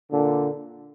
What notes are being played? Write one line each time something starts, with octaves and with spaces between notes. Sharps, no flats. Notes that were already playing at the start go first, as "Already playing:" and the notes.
A#2 D3